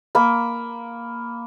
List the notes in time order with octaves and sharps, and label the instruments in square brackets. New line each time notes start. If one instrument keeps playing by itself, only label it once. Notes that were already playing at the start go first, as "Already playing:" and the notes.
[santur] A#3 B5